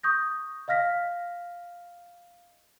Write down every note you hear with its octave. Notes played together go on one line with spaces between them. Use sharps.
C#6 D#6 G6 A#6
D#5 F5 F6 A#6 B6